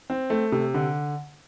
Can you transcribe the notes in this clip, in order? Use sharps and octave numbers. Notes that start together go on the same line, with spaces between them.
C4
A3
C3
D3